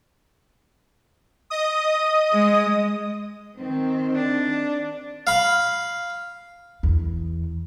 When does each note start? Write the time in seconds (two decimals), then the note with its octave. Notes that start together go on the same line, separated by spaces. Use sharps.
1.50 D#5 D#6
2.33 G#3
3.58 D#3 C4
4.15 D4
5.27 F5 B5
6.83 E2